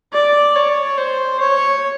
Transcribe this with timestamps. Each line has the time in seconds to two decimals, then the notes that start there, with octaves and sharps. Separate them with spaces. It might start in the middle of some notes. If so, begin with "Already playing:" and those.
0.13 D5
0.56 C#5
0.98 C5
1.40 C#5